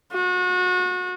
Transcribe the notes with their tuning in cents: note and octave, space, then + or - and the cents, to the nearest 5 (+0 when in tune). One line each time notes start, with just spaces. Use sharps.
F#4 -30